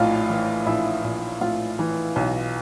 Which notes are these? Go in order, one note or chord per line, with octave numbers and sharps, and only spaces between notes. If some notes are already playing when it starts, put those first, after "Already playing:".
Already playing: A#1 A2 D#4 F4 F5
E3
A#1 E4 E5
A#1
A2 F4 F5
E3
B1